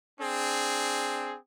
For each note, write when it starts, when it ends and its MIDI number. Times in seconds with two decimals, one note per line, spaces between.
0.20 1.36 60
0.20 1.36 62
0.20 1.36 68